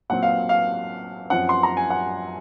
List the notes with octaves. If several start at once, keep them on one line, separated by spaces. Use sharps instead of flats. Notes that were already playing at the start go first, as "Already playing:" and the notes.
A#2 F#3 C4 F#5
F5
F5
F#2 F3 C4 F#5
C6
A#5
G#5
F#5